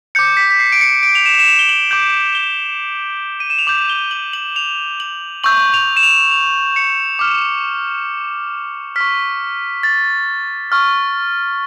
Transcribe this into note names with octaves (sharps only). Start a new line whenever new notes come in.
D6 G6 C#7
B6
B6
C7
D7
C#7
D7
F7
E7
E7
F7
G7
F#7
D6 G6 F#7
G7
D#7
E7
F7
D6 G6 F#7
G7
F#7
F#7
F7
F#7
C#6 E6 G6 F#7
F7
E7
F7
F7
C#7
D6 F6
C#6 F6 B6
A6
C#6 F6